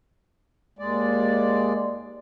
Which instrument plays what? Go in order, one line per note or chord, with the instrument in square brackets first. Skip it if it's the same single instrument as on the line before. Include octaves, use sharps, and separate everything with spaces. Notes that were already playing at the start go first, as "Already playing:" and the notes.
[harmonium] D#2 G#3 D5